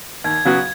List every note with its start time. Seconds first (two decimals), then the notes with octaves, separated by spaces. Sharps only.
0.24 D#2 G#6
0.45 C#3 F#3 B3 F#4